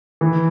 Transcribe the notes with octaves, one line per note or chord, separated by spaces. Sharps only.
E3